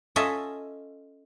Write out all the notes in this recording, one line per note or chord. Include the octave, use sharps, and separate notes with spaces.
C#4 F4 A4 D#5 E5 A5